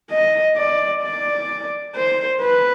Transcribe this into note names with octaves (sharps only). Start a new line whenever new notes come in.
D#5
D5
D5
C5
B4